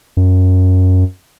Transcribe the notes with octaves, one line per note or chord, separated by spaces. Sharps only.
F#2